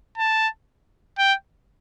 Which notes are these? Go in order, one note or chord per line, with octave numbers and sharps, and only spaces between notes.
A5
G5